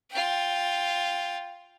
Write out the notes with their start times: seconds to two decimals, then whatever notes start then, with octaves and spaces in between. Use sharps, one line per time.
0.11 F4 G5